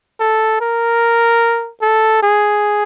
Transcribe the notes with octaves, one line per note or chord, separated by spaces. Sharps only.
A4
A#4
A4
G#4